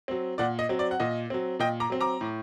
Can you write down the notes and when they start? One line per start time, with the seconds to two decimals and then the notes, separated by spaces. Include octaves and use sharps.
0.08 F#3 C4
0.38 A#2 D5 F#5
0.59 D#5
0.69 F#3 C4
0.79 D5
0.91 F#5
1.00 A#2 D#5
1.30 F#3 C4
1.59 A#2 D#5 G5
1.80 A#5 D6
1.90 F#3 C4
2.01 A#5 D6
2.21 A2